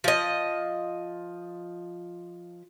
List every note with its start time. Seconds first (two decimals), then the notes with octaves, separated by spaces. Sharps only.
0.04 F3 D#5